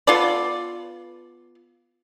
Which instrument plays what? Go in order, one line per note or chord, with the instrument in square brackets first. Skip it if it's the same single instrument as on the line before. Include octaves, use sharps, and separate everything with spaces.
[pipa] B3 F4 A4 D5